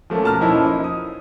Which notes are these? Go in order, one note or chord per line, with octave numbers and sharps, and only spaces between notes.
F3 A3 A#3 C#4
B2 A5 A#5 F6
F3 A#3 C#4 D#4 E4
D#4
D#6